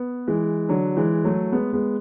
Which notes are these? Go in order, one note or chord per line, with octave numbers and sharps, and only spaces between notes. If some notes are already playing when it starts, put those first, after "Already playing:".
Already playing: B3
E3 G#3
D3 F#3
E3 G#3
F#3 A3
G#3 B3
G#3 B3